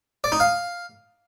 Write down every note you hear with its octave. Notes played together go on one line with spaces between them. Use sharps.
D5
D#4
F5